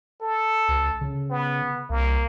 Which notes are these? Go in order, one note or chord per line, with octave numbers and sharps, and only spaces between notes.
A4
C#2
C#3
B3
C2 A#3